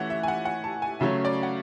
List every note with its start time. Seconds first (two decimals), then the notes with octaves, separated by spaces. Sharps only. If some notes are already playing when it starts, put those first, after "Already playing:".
Already playing: E3 A3 C#4 E5 F#5
0.10 E5
0.23 G#5
0.28 F#5
0.45 F#5
0.64 A5
0.82 G#5
1.00 C#3 F#3 A3 C#4 E5
1.25 D5
1.43 F#5